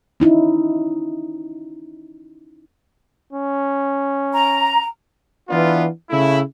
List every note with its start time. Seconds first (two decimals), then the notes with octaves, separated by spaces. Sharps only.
0.20 C#4 D#4 E4
3.33 C#4
4.33 A#5
5.49 E3 B3 D4 F4
6.10 C#3 A3 E4